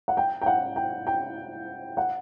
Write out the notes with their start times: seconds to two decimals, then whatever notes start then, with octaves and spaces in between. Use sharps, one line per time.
0.08 F#5
0.17 G5
0.42 G5
0.46 F#5
0.76 G5
1.07 G5
1.97 F#5